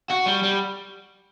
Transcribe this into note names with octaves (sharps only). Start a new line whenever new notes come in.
F#4
G3
G3